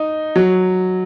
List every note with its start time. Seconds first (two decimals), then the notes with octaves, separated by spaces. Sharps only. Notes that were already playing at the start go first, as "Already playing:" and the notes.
Already playing: D#4
0.36 F#3